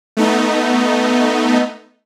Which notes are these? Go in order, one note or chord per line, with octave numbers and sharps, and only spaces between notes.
A3 B3 D#4